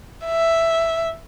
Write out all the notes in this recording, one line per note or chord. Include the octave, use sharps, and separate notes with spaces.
E5